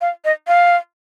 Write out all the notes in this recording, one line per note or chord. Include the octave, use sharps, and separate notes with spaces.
F5
D#5
F5